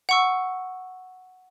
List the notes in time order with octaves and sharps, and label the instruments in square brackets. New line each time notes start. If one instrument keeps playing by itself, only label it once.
[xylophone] F#5 C#6 E6